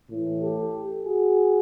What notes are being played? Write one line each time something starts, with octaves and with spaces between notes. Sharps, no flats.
A2 E3
G4 A4
F#4 G#4